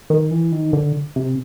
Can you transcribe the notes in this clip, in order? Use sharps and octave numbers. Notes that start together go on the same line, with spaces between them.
D#3
E3
D#3
D3
C3